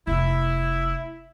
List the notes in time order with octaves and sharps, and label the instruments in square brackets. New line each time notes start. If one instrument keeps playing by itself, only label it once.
[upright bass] F1 [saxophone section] E4